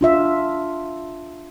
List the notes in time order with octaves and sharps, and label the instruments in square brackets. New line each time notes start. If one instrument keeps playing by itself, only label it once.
[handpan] D4 F4 E5